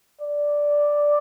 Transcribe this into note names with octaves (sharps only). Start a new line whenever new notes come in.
D5